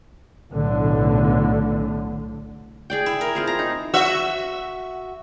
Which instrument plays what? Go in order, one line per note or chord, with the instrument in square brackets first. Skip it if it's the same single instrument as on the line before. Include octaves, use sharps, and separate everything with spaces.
[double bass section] B1 A2 D3
[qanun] G#4 D5 G5
[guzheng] E4
A#4
[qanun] C4 F4 G#4
[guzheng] A#5
[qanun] D#4
[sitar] F#4 E5